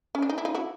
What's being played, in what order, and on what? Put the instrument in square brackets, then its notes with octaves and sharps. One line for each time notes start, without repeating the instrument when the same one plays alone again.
[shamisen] C#4
D4
D#4
E4
D#4 F4
E4 F#4